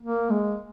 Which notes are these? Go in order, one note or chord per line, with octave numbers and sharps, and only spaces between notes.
A#3
G#3